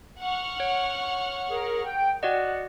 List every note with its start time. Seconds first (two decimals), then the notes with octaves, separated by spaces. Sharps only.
0.20 F#5 C#6 F6
0.60 C#5
1.49 G#4 A#4
1.84 G5
2.23 F#4 D5 D#5 F#5